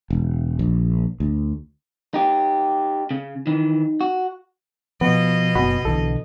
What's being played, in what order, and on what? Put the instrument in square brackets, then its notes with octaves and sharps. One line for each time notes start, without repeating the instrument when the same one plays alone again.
[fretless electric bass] E1
A#1
D2
[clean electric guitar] D#4 G4
C#3
[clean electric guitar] D#3 E3 [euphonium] D#4
[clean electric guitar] F#4
[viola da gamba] B2 D#5 [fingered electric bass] F3 [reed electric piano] B3
[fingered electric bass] F#1 F#2 B3 [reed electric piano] F#4 B5
[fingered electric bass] B1 D3 [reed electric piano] E3 A4